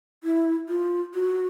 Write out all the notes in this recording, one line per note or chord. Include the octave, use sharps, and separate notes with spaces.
E4
F4
F#4